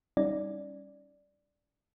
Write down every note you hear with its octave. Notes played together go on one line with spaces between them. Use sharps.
G3 C#4 D#4 D5